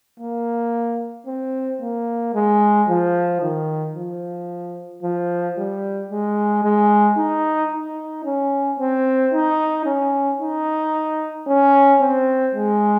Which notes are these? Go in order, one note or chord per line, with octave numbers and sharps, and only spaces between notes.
A#3
C4
A#3
G#3
F3
D#3
F3
F3
G3
G#3
G#3
D#4
D#4
C#4
C4
D#4
C#4
D#4
C#4
C4
G#3